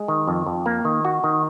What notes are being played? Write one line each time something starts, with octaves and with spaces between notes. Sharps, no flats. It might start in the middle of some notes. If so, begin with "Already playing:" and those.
Already playing: G#3
D#3
F2
F2
A#3
D#3
F#4
D#3